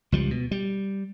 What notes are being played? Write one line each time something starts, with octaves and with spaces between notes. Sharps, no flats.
C#2 F3 G3
B2
G3